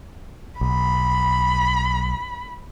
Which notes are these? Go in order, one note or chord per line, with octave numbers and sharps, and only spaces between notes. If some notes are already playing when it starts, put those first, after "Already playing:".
B1 B5